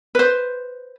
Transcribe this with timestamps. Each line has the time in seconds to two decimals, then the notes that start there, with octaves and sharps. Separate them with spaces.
0.15 B4 C5